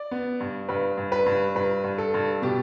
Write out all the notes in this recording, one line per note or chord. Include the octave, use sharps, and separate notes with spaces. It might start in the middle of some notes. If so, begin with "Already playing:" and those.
Already playing: D5
B3
G2
G2 B4
G2
B4
G2
G2 B4
G2
A4
G2
B2 G4